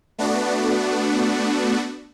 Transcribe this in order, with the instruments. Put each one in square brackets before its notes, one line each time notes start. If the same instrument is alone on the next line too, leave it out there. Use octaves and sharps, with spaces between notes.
[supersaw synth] A3 B3 D4 F#4